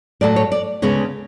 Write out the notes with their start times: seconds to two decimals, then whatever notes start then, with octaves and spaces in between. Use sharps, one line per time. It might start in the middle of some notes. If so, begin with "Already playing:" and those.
0.21 A2 F#3 A3 D5
0.36 C#5
0.52 D5
0.82 D2 C#3 G#3 B3 C#5